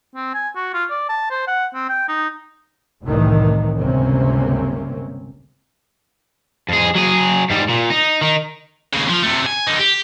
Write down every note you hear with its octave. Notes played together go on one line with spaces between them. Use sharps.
C4
G#5
F#4
F4
D5
A5
C5
F#5
C4
G5
D#4
F1 C2 A2 C3 D#3 E3
G1 C#2 C3 A#3 C4 C#4
F2 G#4
F#3 G#4
G#2 G3
A#2
D#4
D#3 D#4
D#2 C#3
F3 F4
C3 A3
G#5
D3 D#4
G4